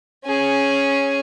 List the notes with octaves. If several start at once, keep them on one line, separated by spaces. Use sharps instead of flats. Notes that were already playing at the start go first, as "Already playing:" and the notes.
C#4 G#4